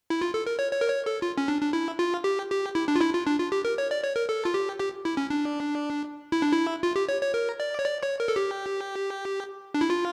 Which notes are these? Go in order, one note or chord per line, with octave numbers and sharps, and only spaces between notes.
E4
F4
A4
A#4
C#5
C#5
A#4
C#5
A4
F4
C#4
D4
D4
E4
F4
G4
G4
E4
D4
F4
E4
F4
D4
F4
G4
A#4
C#5
D5
C#5
A#4
A4
F4
G4
G4
E4
C#4
D4
E4
D4
E4
F4
G4
C#5
C#5
A#4
D5
C#5
D5
C#5
A#4
A4
G4
D4
E4
F4